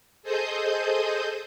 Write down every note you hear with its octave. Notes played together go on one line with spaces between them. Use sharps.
G#4 A4 C5 D#5 D#6 G6